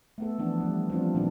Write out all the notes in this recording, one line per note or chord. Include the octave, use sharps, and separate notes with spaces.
A3 B3 A4
E3 F3 B3 D4
G3 A3
F3 G3 C4 D4 F4
A#2 D#3 A#3 B3 D4